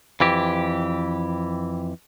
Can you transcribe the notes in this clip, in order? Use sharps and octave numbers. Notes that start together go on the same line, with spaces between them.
F2 E3 G4